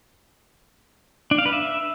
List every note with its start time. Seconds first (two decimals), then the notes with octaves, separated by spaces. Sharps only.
1.31 D4
1.38 F5
1.46 B4
1.53 E5